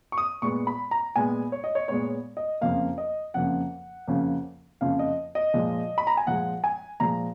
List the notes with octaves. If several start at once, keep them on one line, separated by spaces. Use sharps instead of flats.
C#6
D#6
A#2 G#3 B3 C#6
B5
A#5
A#2 G#3 B3 G#5
C#5
D#5
C#5
A#2 G#3 B3 C#5
D#5
F2 C#3 F3 A#3 F5
D#5
F2 C#3 F3 A#3 F#5
F2 C#3 F3 A#3
F2 C#3 F3 A#3 F5
D#5
D#5
A#2 F3 G#3
B5
A#5
G#5
A#2 F3 G#3 F#5
G#5
A#2 F3 G#3 A#5